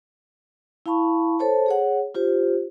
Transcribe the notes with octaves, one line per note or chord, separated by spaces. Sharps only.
E4 F5 A5 B5 C#6
A4 C5 C#5 A5
G#4 C#5 F#5
F4 G4 C5